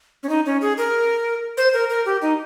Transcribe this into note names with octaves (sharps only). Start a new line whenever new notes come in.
C#4
D#4
C#4
G#4
A#4
C5
A#4
A#4
G4
D#4